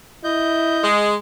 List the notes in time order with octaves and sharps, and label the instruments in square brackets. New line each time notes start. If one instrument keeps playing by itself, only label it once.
[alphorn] E4 [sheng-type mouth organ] D#5 G6
[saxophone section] G#3